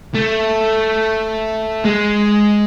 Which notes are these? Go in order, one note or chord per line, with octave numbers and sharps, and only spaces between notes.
A3
G#3